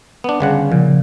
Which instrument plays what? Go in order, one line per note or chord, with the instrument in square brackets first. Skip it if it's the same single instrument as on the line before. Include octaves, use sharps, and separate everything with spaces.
[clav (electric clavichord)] B3 D4
G1 C#3 F#5
[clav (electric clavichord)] A#2 [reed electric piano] C#3 F3